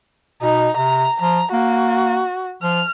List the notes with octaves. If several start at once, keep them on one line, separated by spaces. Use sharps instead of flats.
B2 D#4
C3 A#5
F3 A#5
A#3 F#4
F3 F6